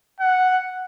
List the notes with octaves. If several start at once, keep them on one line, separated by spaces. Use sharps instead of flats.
F#5